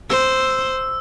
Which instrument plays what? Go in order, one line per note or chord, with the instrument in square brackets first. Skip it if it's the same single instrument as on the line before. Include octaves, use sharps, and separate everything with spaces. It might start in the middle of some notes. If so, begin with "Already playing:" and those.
[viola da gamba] C5 [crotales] E6